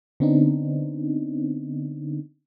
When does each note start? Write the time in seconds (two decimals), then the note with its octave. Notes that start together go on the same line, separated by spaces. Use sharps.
0.20 D3 B3 C4 D4 D#4